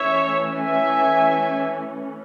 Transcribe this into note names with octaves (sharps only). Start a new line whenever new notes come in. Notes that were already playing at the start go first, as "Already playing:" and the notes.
Already playing: E3 A3 C#4 C#5 E5
E5 G#5